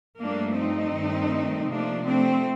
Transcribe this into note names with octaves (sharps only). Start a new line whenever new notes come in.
G2 F3 A3 A#3 D4
C4 D#4
G2 D#3 A3
C3 F3 A3 A#3 D4
A3 C4